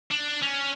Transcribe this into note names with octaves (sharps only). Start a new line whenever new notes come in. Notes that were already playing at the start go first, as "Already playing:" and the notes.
D4
C#4